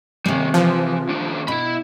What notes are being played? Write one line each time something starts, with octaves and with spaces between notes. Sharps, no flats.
C3 D#3 G3 G#3
E3 F3
D#2 D4
B2 E4 B5